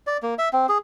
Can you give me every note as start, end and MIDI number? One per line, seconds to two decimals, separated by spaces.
0.07 0.17 74
0.23 0.34 58
0.39 0.49 76
0.53 0.66 60
0.69 0.78 68